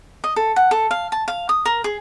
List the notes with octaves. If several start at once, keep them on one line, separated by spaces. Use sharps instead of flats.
D#5
A4
F#5
A4
F5
A5
F5
D#6
A#4
G#4